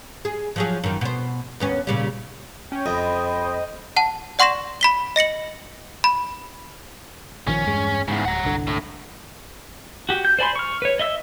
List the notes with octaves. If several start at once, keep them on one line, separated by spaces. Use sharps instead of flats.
G#4
F3 F#3 G#4
F#2 D#3
B2 C5
D#2 B3 C#4
A#2 C#3 G3
C#4 G5
F2 C5 D#5 B5
F#5 A5
D5 F#5 C6 C#6 A#6 E7
B5 B6 G7
D#5 A#6 C#7 F#7
B5
A#1 D#3 F3 C#4
E2 G2 G#3
E2 G#2 C#3
D1 F#5 A#5
G1 C2 D3
A2
F#4 G4
G6
C5 D5 G#5 B5 C6
C#6 F6
B4 C#5
D#5 E5 E6